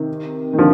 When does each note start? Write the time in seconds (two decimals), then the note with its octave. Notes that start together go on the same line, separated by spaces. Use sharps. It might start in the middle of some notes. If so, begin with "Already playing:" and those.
Already playing: C3 D#3
0.53 D#3
0.58 D3 F3